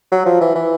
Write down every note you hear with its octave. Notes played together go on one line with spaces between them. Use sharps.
F#3
F3
E3
E3